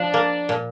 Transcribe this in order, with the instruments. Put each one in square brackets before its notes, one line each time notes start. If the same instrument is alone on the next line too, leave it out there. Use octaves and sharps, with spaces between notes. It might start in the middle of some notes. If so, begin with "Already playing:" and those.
Already playing: [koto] F3 [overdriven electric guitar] D4
[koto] A#3
A#2